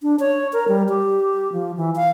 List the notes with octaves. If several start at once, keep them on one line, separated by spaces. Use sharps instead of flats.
D4
C#5
A#4
G3
G4
F3
E3
F5